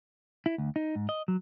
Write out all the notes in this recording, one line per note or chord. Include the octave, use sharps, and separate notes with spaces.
E4
D2
D#4
G#2
D#5
F#3